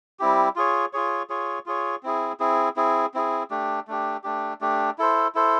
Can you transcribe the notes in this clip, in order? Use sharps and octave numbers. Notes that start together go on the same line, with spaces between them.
G3 C4 E4 G4
F4 G#4 C#5
F4 G#4 C#5
F4 G#4 C#5
F4 G#4 C#5
C4 E4 G#4
C4 E4 G#4
C4 E4 G#4
C4 E4 G#4
A3 D4 G4
A3 D4 G4
A3 D4 G4
A3 D4 G4
E4 A4 C5
E4 A4 C5